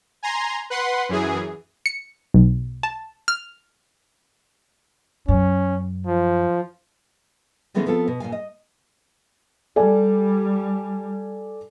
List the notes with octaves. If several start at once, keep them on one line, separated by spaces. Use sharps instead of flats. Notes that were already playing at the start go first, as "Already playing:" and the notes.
G#5 A#5 C6
B4 F#5 C6
F#2 E3 G#4
C#7
B1
A5
F6
F#2 C#4
F3
D#3 E3 G#3 A3 B3 C#4
F3 B3 C4 F4 A4
B2
A#2 F3 F5 G#5
D#5
G3 A4 D5 G#5